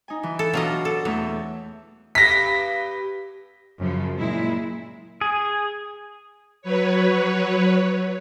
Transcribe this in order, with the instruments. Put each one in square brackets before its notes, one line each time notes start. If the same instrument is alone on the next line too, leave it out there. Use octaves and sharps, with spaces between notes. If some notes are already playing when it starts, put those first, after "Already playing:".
[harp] D#4 G#5
E3
[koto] A4
[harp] B2 D4 D#4 [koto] F#3 F4 D#5
[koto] A4
[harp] E2 A3 E5 [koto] F#3
[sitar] G2 B3 G4 [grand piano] A#6 B6
[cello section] F#2 C#3 F3
A#2 G#3 E4
[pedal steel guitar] G#4
[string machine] F#3 B4 C#5